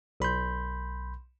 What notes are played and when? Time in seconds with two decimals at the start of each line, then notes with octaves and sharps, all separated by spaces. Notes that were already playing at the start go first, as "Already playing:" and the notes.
0.20 B1 B5 C6 G6